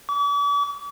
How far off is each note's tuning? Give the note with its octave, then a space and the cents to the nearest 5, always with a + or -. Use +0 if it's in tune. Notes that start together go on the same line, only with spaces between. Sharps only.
D6 -45